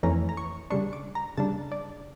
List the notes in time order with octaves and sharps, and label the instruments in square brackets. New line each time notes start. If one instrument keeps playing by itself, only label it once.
[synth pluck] F2 E3 A3 C#4 A#5
A#5
C#6
C#3 G3 D4 C#6
D6
A#5
C#3 G3 D4 A5
D5